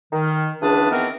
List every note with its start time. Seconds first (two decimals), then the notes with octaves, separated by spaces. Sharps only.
0.13 D#3
0.62 C#2 E3 D4 B4 A5 D#6
0.91 D#3 E3 B3 C4 A#4